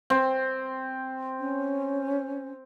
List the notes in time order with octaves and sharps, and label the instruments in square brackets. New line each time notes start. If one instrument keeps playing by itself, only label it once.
[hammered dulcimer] C4
[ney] C#4